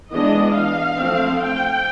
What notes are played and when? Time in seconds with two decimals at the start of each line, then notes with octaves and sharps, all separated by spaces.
0.12 E3 G#3 B3 D4 D#5
0.55 F5
0.98 F3 A3 C4
1.42 G5